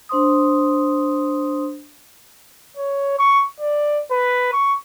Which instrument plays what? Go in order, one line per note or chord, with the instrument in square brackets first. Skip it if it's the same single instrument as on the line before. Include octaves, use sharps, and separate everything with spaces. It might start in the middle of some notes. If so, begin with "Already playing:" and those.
[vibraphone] D4 C5 C6 D#6
[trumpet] C#5
C#6
D5
B4
C#6